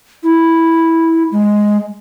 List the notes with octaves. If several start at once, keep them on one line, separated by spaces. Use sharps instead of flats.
E4
G#3